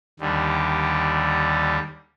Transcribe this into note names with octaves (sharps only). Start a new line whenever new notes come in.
D#2 D3 G3